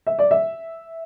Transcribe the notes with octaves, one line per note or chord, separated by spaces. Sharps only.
E5
D5
E5